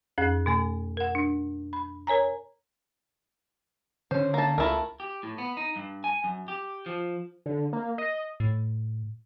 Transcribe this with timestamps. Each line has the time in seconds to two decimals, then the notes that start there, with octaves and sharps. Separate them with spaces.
0.18 F2 C#4 G#4 F#6
0.46 B2 A3 G#5
0.97 A#4 F#5
1.15 D4
1.73 B5
2.07 A#4 C#5 G#5 A#5
4.11 D3 C#4 C5
4.34 A#3 A5
4.58 C#2 A3 E4 F4 A#4 A5
5.00 G4
5.23 A2
5.38 B3
5.57 D#4
5.76 G2
6.04 G#5
6.24 F#2
6.48 G4
6.86 F3
7.46 D3
7.73 A#3
7.98 D#5
8.40 A2